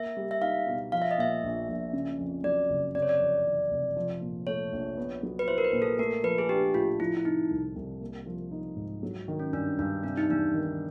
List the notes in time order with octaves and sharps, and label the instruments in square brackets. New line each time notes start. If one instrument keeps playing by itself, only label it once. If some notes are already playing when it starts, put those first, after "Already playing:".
Already playing: [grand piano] A#3 [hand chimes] E5
[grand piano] G3
[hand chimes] E5
[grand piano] D#4 [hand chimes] F5
[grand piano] B2
[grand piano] F3 [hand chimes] F5
[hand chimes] E5
D#5
[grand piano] A#2 [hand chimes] E5
[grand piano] A#1
A#1
C#3
F2
[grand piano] F#3 [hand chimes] D5
[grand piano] F#1
[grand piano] C3 [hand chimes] D5
[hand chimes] C#5
D5
[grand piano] F2
E3
F1
F3
A#2
[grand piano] A3 [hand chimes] C#5
[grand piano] A#1
B3
F#3
[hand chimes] B4
[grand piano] E4 [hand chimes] C5
[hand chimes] A#4
B4
[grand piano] A#2
[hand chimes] A4
[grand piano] A3 [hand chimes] A#4
[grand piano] F3 [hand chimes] B4
[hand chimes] G#4
[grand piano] D4 [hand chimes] G4
[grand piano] A2 [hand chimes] F4
[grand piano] F3 [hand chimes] E4
[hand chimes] E4
[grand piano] C3 [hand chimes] D#4
[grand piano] C2
C2
A#3
F3
D#4
G#2
F#3
D#3
[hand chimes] C#4
[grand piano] G2 [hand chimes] D4
[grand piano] G2 [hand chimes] D4
[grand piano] C3 [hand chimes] D4
[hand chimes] D#4
[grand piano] E2 [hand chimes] D4
[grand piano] D#3